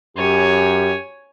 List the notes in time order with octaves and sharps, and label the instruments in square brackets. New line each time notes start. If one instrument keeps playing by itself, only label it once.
[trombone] F#2 [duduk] G4 [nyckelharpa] C#5 G#5